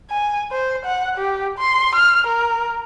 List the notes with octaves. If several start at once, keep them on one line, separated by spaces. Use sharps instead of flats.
G#5
C5
F#5
G4
C6
F6
A#4